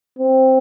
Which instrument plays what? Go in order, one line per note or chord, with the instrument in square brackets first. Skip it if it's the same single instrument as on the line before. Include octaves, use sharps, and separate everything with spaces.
[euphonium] C4